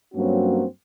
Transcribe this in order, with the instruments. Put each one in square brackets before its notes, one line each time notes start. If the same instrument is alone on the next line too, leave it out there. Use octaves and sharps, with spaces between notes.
[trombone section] G2 F#3 A#3 C4 C#4 F#4